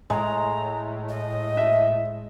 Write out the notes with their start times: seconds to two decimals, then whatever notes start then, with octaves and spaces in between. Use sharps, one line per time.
0.10 A2 G#3 A#5
1.09 D#5
1.57 E5